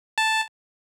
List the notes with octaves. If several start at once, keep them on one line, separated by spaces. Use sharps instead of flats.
A5